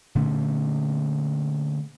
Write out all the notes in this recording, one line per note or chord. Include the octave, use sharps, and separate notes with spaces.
A#2 D3 A3 C#4